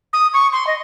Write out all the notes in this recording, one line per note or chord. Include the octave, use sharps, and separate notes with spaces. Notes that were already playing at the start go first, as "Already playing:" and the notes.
D#6
C#6
C6
D#5